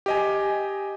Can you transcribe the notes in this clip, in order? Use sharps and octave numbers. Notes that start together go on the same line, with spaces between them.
G4 D#5 G#5